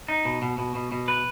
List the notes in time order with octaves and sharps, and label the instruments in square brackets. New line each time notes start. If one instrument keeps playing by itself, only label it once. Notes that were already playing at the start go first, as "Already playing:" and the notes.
[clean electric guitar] D#4
B2
B2
B2
B2
B2
B4